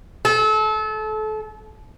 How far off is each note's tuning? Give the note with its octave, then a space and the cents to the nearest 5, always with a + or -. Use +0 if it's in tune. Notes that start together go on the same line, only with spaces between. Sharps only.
A4 -30